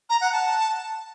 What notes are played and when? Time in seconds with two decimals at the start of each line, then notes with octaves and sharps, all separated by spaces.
0.10 A#5
0.21 F#5
0.32 A5